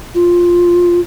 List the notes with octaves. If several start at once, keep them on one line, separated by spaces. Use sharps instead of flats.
F4